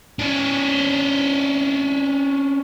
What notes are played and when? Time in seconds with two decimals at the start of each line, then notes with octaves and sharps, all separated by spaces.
0.19 C#4 D4